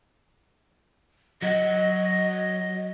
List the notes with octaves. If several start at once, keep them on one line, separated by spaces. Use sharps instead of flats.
F#3 F#4 D#5